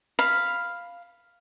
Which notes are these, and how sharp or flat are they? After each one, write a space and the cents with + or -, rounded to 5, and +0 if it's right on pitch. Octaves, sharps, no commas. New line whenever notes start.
F5 +0 B5 +0